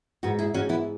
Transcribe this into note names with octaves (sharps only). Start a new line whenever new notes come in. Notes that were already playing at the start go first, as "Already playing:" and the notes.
G#2 F#4 B4
E4 G#4
G#2 C#4 F#4
B3 E4